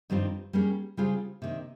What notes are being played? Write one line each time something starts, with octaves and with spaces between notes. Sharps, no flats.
G2 D#3 G3 C4 F4
G3 A#3 C#4 G#4
C#3 G3 C4 F4 G#4
C3 D#3 A#3